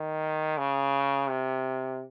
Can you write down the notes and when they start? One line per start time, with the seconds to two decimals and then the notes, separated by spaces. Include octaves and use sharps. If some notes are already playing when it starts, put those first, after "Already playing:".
Already playing: D#3
0.58 C#3
1.29 C3